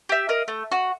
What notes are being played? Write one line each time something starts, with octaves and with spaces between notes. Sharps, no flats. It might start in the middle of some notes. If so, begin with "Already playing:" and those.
G4 E5
A#4 D#5 F5
A3
F#4